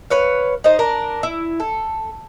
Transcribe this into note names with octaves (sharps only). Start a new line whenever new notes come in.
B4 C#5 F5
D#4 C5
D4 A#4
E4
A4